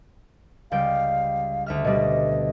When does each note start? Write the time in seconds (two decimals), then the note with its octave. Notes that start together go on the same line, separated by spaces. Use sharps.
0.71 C#2 G3 F5 G5
1.66 D2 E5 F6
1.85 B2 G3 D#5